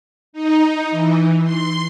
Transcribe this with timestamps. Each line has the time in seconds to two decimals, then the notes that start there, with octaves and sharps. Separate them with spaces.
0.33 D#4
0.91 E3
1.43 C6